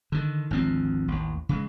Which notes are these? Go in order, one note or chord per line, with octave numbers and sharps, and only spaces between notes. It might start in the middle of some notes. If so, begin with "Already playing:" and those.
D3 D#3
G#1 D2 F3 C4
A1 D#2
C#3 E3 G#3